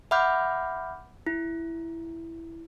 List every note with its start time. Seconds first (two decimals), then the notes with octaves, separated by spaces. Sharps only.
0.11 E5 F#5 B5 D6 F6 G6
1.27 E4